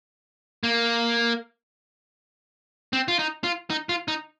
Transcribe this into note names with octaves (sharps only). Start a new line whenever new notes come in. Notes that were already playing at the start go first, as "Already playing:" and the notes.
A#3
C4
F4
D#4
F4
D#4
F4
D#4